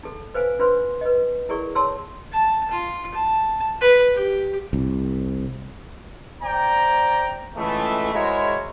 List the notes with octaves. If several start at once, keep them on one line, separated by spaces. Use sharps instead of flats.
D#4 A4
B4 C5 F5 G#5
D4 F4 B4 C5 C6
B4 D#5
E4 G#4 A#4 D5 C#6
C#5 A5 C6 E6
A5
F4
A5
B4
G4
C2
C5 D5 G5 A#5
C#2 E3 G#3 A3
G#3 E4 F#4 A#4 C5 C#5